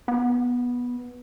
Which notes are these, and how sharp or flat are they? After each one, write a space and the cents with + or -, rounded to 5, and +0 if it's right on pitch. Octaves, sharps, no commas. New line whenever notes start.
B3 -10